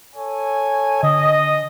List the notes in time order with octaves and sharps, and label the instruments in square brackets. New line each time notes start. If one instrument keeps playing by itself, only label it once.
[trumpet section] A4 C#5 G#5
[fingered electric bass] D3 [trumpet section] D#5